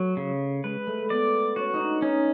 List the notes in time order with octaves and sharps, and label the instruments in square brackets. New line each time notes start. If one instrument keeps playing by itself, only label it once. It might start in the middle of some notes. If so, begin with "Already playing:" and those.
Already playing: [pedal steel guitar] F#3 [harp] A3
[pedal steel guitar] C#3
[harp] G#3 [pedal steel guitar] B4
[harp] A3
[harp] B3 [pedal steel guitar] D5
[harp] C#4 [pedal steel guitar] F#4
[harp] D#4
D4
[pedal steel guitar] C#4 [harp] D#4